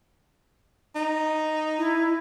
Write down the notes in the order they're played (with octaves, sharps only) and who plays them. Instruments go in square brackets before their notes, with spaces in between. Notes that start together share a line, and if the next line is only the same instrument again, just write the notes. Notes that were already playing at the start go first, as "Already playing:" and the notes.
[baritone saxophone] D#4
[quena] E4